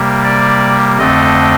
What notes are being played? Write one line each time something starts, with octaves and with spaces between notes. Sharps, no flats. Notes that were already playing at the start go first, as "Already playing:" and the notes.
Already playing: C3 G3 A#3
D5
F2 D3 A3 C4 D#5